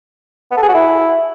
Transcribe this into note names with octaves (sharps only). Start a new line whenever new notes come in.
B3
A4
G#4
F#4
E4